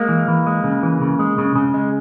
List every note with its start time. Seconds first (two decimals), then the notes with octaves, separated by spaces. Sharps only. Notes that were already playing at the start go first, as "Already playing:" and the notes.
Already playing: G#3 A#3
0.09 E3
0.28 E3
0.47 G#3
0.64 C#3
0.83 E3
1.01 C#3
1.19 G#3
1.38 C#3
1.56 C#3
1.74 G#3